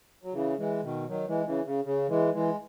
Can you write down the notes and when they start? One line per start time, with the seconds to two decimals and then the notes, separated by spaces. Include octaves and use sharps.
0.24 F#3
0.33 C#3 E3
0.58 E3 G#3
0.83 B2 D#3
1.08 D#3 F#3
1.27 E3 G#3
1.46 C#3 E3
1.65 C#3
1.84 C#3
2.09 E3 G#3
2.34 E3 G#3